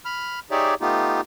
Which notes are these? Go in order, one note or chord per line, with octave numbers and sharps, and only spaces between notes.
B5 F6
D#4 G4 G#4 C#5 D5 E5
A3 B3 D#4 F4 G4